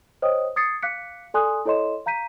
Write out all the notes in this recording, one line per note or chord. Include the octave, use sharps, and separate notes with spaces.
C5 C#5 D#5 G5 D#6
D#6 G#6 A6 C7 C#7
F5 D6 F#6 B6 C#7
A4 D5 G#5 C6 D#6 F#6
E4 A4 C#5 D#5 C6 E7
F5 A#5 G6 B6 D#7